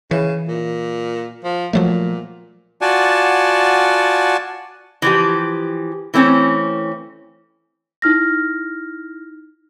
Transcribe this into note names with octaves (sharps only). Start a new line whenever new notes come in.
C#3 E3
A#2
F3
A#2 F3 F#3 A3
F4 F#4 D5 F#5 G#5 A5
E3 F3 G4
E3 A3 C4 C#4
D#4 E4 F6 A#6